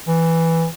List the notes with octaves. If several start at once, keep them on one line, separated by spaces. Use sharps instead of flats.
E3